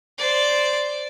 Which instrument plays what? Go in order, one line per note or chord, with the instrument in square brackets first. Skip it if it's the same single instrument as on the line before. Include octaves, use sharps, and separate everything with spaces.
[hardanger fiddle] C5 D5